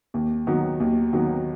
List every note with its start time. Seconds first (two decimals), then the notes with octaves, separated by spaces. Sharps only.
0.14 D#2
0.47 D#3 F#3 B3
0.80 D#2
1.13 D#3 F#3 B3